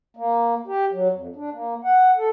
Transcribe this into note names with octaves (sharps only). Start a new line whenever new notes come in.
A#3
G4
F#3
F2
D4
A#3
F#5
A4